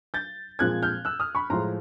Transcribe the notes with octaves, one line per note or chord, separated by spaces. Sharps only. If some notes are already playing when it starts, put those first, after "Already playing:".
G6 A6
A#2 F3 G#3 C4 F#6 G#6
F6 G6
E6 F#6
D#6 F6
B5 C#6
A2 F3 G#3 A#5 C6